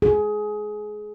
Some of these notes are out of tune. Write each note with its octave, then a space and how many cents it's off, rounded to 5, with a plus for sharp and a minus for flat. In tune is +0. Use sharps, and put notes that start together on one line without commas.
G#4 +20